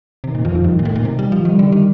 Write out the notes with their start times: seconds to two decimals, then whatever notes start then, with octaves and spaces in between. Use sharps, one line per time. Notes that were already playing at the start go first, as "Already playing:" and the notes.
0.24 C3 D#3
0.35 A#2
0.45 F2 F3
0.55 F2
0.64 G2 D#3
0.79 A#2
0.85 A2
0.95 A#2
1.05 C3
1.19 G3
1.32 F3
1.45 D#3 G3
1.59 D3
1.65 G3
1.72 D#3